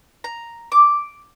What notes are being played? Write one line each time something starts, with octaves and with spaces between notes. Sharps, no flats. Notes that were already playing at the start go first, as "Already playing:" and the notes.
A#5
D6